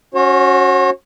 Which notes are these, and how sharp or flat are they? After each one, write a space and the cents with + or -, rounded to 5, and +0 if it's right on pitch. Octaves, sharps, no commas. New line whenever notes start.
C#4 +0 F#4 +0 C#5 -45